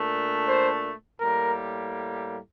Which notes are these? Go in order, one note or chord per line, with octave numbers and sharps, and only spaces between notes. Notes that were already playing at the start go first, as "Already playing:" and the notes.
Already playing: A#2 A3 D4
C5
A2 G3 A#3 A#4